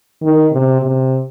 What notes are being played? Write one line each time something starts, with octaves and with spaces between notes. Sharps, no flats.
D#3
C3
C3